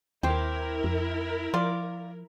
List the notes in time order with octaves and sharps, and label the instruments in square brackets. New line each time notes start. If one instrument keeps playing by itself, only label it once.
[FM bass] D#2 [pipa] C4 G4 [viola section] E4 A#4
[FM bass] F2
[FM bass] F3 [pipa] F4 D5